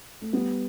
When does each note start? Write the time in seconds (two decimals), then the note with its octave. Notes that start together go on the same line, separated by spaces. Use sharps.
0.22 A3
0.33 G3 B3